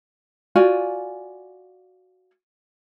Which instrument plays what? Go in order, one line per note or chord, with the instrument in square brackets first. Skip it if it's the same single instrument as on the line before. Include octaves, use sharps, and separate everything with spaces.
[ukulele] F4 F#4 D5 G#5